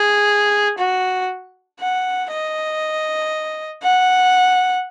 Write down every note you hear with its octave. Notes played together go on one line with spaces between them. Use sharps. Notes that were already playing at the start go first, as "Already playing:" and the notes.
Already playing: G#4
F#4
F#5
D#5
F#5